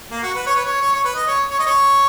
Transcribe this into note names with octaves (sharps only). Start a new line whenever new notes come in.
A#3
F#4
B4
C#5
B4
C#5
C#5
C#5
B4
D#5
C#5
C#5
D#5
C#5